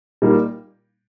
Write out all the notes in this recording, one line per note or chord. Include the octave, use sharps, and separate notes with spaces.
A#2 G3 A#3 D#4